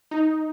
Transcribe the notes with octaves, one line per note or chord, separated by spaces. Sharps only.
D#4